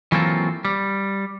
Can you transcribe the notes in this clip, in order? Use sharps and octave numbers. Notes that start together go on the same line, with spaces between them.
E3 F#3 A#3 C4 F4 A4
G3